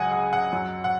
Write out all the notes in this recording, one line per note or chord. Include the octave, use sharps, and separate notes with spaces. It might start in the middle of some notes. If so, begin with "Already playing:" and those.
Already playing: C#2 C#3 F#3 D#5 F#5 G#5
F#5
F#5
F#2 F#3
F#5